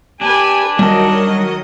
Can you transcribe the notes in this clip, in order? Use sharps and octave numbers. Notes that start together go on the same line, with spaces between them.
D4 G4 B4 G#5
D#3 F#3 G3 F#4 D#5 A5